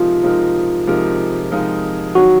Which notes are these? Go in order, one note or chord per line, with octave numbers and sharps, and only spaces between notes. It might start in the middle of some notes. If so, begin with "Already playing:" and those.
Already playing: C3 F3 G#3 D#4 F4 A#4
C3 F3 G#3 D#4 A#4
C3 F3 G#3 D#4 A#4
C3 F3 G#3 D#4 A#4
D#3 F#3 F#4